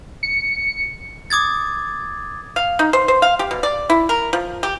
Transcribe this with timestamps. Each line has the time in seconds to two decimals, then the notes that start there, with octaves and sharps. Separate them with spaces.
0.23 C#7
1.30 D6 D#6 G#6 A6
2.56 F5
2.79 D#4
2.93 C5
3.08 C5
3.22 F5
3.39 G4
3.51 B2
3.63 D5
3.90 E4
4.09 A#4
4.33 F3
4.63 G4